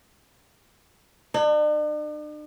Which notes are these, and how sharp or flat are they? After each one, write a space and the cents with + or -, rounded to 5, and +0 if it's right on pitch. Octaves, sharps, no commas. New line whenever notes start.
D4 +45